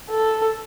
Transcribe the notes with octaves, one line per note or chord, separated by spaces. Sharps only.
A4